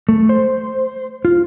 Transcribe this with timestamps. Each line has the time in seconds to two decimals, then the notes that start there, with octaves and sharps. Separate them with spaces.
0.09 A3
0.29 C5
1.25 F4